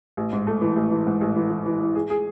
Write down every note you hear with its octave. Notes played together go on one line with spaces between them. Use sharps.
A1
G#2
A3
E3
A1
E3
G#2
A1
E3
E3
E3
E3
G#4
G#4